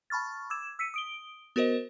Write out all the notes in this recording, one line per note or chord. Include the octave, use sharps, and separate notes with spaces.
A5 B5 C#6 F6 A6
D6 E6 G#6 E7
E6 B6 C#7 D#7
D#6 D7 G7
B3 F#4 A#4 C5 D#5